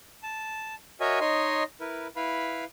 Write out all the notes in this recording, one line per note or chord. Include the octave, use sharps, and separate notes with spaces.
A5
F#4 A#4 C#5 D#5 E5 G#5
D#4 C#5 D#5 C6
E4 A#4 B4
E4 B4 F5 B5